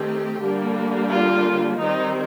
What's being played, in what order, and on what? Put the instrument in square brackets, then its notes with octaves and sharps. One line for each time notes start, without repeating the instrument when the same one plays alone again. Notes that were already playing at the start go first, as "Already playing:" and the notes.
Already playing: [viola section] D#3 A3 C4 G4
D3 G3 A#3 D4
F4
D#3 G3 C4 D#4